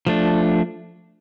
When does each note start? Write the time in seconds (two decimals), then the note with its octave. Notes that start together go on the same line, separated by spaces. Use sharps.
0.07 F3 A3 D4